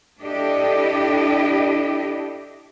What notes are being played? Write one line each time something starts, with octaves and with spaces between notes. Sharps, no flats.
D4 E4 G4 A4 D#5